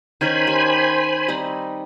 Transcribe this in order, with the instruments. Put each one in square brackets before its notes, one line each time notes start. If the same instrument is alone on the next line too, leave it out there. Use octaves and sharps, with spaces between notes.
[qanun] D#3 C#4 A#4 [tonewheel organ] C5 G#5 B5
[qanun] G4
G3 C4 D#4